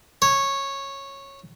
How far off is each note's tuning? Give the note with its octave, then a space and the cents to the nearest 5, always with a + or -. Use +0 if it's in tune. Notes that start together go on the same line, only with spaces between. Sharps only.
C#5 -10